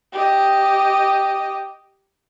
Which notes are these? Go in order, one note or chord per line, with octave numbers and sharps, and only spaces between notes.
G4 D#5